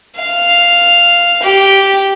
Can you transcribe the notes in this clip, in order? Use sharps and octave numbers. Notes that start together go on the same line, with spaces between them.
F5
G4